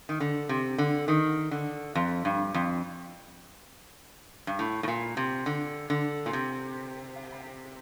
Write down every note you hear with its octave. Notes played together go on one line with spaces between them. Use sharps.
D#3
D3
C3
D3
D#3
D3
F2
G2
F2
G2
A2
A2
A#2
C3
D3
D3
A#2
C3